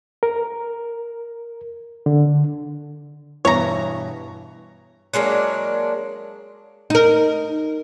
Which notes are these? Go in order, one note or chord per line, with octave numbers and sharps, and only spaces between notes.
A#4
D3
G2 B2 E3 C#5 A#5
F#3 G#3 A#3 D4
D#4 A#4